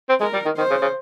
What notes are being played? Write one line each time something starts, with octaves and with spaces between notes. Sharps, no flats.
C4
G#3 A#4
G3
D#3
D#3 C5
C#3
C#3